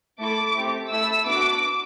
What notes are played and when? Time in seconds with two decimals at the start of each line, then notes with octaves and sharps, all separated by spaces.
0.19 A3 E4 A4 D6
0.55 A3 C4 G4
0.90 A3 E4 A4 E6
1.26 B3 D4 F#4 D6